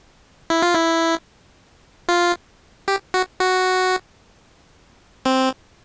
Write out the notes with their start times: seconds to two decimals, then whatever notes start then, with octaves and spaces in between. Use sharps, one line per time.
0.50 E4
0.63 F4
0.74 E4
2.09 F4
2.88 G4
3.14 F#4
3.40 F#4
5.25 C4